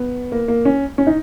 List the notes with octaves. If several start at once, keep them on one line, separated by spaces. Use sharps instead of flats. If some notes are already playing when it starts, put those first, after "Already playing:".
Already playing: B3
A#3
A#3
C#4
C#4
D#4